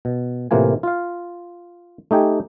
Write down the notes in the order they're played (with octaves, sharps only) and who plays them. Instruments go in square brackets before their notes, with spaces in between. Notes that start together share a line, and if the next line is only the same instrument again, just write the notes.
[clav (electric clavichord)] B2
A2 C3 E3 A#3 F4 G#5
F4 F5
A3 D#4 G4 G5 G#5